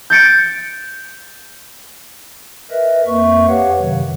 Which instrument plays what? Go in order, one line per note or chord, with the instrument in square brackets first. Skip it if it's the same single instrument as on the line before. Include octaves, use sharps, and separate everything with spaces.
[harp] G6 A6 C#7 D7
[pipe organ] A#4 B4 D#5 E5
F2 A#3 E5 C#6
G4 B4 C#5 F5 F#5
F#2 C3 D#3 F#3